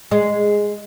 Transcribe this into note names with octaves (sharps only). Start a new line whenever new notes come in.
G#3